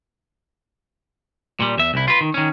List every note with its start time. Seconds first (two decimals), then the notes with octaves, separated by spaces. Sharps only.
1.60 A#2 G3
1.78 E2 E5
1.94 C2 E4
2.08 F4 B4
2.21 D#3
2.34 D#3 C#4